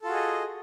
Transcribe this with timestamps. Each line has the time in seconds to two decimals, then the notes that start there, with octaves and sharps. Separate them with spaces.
0.02 A4
0.05 F4
0.08 F#4
0.11 G#4
0.14 D#5